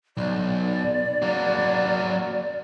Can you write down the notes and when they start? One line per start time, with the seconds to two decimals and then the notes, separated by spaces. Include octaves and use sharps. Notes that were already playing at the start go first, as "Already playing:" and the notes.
0.17 B1 D5
1.22 F#3 A#3